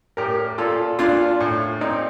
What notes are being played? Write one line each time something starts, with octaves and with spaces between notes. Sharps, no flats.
A2 G4 A#4
A#2 F4 A4
A#2 D4 F4
A2
A#2 C4 D#4